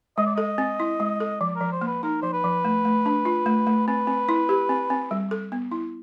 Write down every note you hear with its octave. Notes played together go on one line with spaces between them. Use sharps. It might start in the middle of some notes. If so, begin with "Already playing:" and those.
G#3 D#5
D5
A4 D#5
C4
E4
G#3
A4
F3 D5
A#4
F3
C5
A#3
B4
D#4 A#4
F3 C5
B4
F3
A3
A3
D4
F4
A3
A3
C4 B4
C4
E4
G4
C4
C4
G3
A4
B3
E4